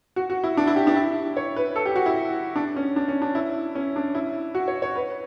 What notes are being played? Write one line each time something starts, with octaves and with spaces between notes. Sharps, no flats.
F#4
F#4
E4
D4
E4
G4
D4
E4
C#5
B4
A4
G4
F#4
E4
D4
C#4
D4
C#4
D4
E4
C#4
D4
E4
F#4
C#5
C#5
B4